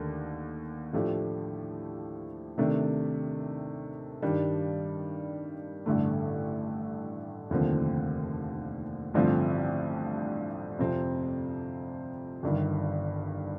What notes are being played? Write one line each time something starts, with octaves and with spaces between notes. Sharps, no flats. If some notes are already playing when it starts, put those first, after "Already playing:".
Already playing: D#2 D3 A3 D4
A2 F3 A3 D4 G4
C3 D#3 A3 D4
G2 D#3 G3 D4
A1 G2 D3 A3
F1 D#2 D3 F3 C4
A1 G2 D3 F3 C4
F2 C3 F3 C4
G1 G2 D#3